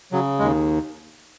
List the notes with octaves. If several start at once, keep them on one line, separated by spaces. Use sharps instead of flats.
C#3 F#3
D#2 G#3